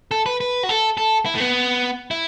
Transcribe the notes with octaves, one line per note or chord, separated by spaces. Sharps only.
A4
B4
B4
F#4
A4
A4
E4
A3
B3
E4